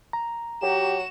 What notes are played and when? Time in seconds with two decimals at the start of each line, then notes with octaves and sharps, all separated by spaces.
0.13 A#5
0.62 F#3 F#4 G4 E7